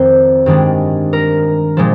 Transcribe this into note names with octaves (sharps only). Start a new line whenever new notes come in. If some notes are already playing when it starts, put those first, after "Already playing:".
Already playing: F2 D#3 C4 A#4 C5 D5
G2 D#3 G#3 D4
A#4
A#2 F3 G#3